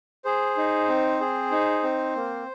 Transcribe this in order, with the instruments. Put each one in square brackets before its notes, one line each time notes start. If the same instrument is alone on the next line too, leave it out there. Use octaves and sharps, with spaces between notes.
[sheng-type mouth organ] G#4 C5
D#4
C4
G#4
D#4
C4
A#3